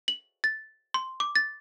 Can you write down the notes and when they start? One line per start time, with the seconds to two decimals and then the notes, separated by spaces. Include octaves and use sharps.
0.08 F#7
0.44 A6
0.94 C6
1.20 D6
1.36 A6